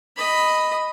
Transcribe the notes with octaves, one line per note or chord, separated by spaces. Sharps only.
D#5 B5